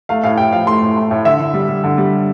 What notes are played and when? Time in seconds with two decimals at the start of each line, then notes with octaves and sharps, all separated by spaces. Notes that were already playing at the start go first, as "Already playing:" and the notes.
0.09 A3 F5
0.24 A2 F5
0.38 A2 G5
0.53 F3 F5
0.67 A3 C6
0.82 A2
0.96 A3
1.11 A2
1.25 D3 E5
1.39 D3
1.54 G3
1.69 G3
1.84 D3
1.98 G3